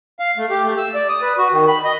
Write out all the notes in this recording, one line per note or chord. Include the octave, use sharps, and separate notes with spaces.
F5
A3
G4
A3
E6
D5
D#6
B4
F#4
D#3
B5
D#5